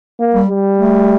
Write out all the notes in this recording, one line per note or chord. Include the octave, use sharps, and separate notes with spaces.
A#3
G3
G3
A3